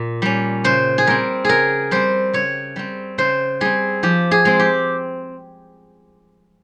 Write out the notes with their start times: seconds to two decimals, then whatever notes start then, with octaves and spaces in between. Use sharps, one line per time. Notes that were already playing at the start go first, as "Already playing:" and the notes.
Already playing: A#2
0.22 G3 C#4
0.64 C#3 C5
0.98 G#4
1.07 G3 C4 A#4
1.45 C#3 G#4 A#4
1.91 G3 C4 C5
2.33 C#3 C#5
2.76 G3 C4
3.18 C#3 C5
3.61 G3 C4 G#4
4.03 F3 G4
4.31 G#4
4.45 G#3 C4
4.59 G4